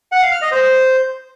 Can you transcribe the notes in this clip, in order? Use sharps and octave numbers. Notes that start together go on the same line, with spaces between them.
F#5
F5
F6
D#5
C5